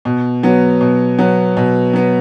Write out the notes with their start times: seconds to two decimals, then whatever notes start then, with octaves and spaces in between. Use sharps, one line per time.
0.05 B2
0.43 F#3 B3
0.81 B2
1.19 F#3 B3
1.57 B2
1.93 F#3 B3